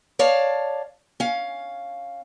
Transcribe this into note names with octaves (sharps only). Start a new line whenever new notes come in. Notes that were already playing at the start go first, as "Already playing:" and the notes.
C#5 D5 F5 A5
C#4 F5